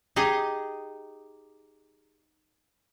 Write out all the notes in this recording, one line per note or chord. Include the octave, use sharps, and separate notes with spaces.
D#4 G4 G#4 D#5